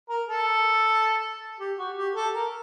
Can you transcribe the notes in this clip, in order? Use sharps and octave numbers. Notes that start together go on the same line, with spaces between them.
A#4
A4
G4
F#4
G4
A4
A#4